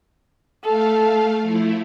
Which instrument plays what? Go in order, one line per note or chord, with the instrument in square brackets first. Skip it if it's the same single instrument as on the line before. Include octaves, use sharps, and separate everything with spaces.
[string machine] A3 F5 [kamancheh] A4
[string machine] F3 A3 E4